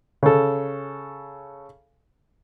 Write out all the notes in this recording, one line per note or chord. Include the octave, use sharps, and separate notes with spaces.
C#3 A4